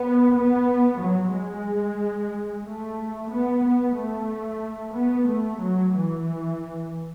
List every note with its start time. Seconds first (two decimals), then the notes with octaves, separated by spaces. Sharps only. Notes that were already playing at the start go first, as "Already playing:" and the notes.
Already playing: B3
0.34 B3
0.99 F#3
1.32 G#3
2.64 A3
3.30 B3
3.62 B3
3.95 A3
4.93 B3
5.27 A3
5.59 F#3
5.93 E3